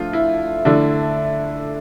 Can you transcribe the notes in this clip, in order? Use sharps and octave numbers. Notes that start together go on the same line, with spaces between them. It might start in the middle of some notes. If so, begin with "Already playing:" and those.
Already playing: F3 A3 D4 F4
E4
D3 A3 D4 E4